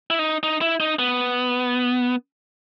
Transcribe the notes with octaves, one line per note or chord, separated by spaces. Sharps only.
E4
D#4
D#4
E4
D#4
B3